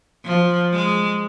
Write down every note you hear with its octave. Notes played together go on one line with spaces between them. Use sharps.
F3
G#3